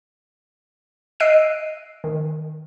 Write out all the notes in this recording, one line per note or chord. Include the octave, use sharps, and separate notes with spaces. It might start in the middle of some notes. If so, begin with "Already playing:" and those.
D#5 E6 F#6 C7 D7 D#7
D#3